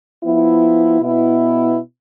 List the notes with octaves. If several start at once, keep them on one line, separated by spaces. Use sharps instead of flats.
F3 B3 E4
B2 B3 E4